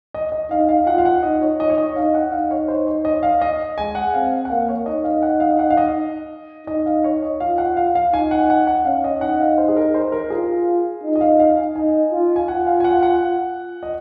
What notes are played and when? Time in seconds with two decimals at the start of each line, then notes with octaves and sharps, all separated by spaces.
0.14 D#5
0.32 D#5
0.51 D#4 F5
0.69 F5
0.86 F4 F#5
0.98 F5
1.05 F#5
1.23 D#4 D#5
1.41 C#5
1.60 D#4 D#5
1.70 C#5
1.78 D#5
1.96 D#4 F5
2.14 F#5
2.32 D#4 F5
2.51 C#5
2.68 C5
2.87 C#5
3.05 D#5
3.23 F5
3.41 D#5
3.78 G#3 G#5
3.95 F#5
4.14 C4 F5
4.45 F#5
4.50 A#3 F5
4.68 C#5
4.86 D#4 D#5
5.04 F5
5.22 F#5
5.40 F5
5.59 F#5
5.70 F5
5.77 D#5
6.67 D#4 D#5
6.86 F5
7.04 C#5
7.23 D#5
7.40 F4 F5
7.58 F#5
7.77 F5
7.95 F5
8.13 D#4 G#5
8.31 F#5
8.50 F#5
8.67 F#5
8.85 C#4 F5
9.04 D#5
9.21 D#4 F#5
9.41 F5
9.58 C5
9.68 G#4
9.76 A#4
9.94 C5
10.12 A#4
10.30 F4 G#4
11.03 D#4
11.16 D#5
11.21 F5
11.40 F5
11.58 G#5
11.76 D#4 G#5
12.12 F4
12.36 G#5
12.48 F4 F#5
12.67 F5
12.80 G#5
12.84 F#5
13.03 F#5
13.83 D#5